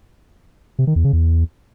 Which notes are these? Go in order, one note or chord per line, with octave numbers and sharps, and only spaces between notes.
C3
D#3
E2
C#3
E2